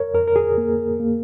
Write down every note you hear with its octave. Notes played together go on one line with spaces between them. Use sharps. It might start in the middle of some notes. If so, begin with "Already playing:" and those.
Already playing: F2 A#4 C#5
F2 A#4
A#4
G#4
A#3
A#3